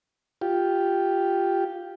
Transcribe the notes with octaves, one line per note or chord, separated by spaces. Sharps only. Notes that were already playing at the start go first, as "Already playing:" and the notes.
F4 G4